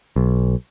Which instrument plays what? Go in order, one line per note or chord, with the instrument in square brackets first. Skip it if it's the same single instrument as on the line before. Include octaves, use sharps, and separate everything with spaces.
[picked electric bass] B1